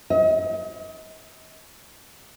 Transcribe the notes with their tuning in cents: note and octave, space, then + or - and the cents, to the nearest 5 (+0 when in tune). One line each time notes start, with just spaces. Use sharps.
D#5 +35